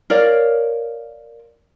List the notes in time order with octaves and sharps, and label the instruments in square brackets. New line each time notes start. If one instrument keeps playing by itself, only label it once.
[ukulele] A#4 C#5 D5 F5